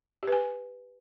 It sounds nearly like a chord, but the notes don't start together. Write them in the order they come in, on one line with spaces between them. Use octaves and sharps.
G4 B4 G#5